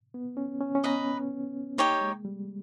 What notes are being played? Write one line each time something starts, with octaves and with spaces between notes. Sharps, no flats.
B3
C#4
C#4
C#4
B3 B4 D#5 A#5
A#3 D#4 G4 C#5 G5
G#3
G3